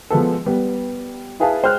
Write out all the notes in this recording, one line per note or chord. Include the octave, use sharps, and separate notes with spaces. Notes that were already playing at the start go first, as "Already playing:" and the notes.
F3 G#3 B3 A4
G3 B3
E4 G#4 B4 F5 G#5 A5
G#3 C5 G5 F6 F#6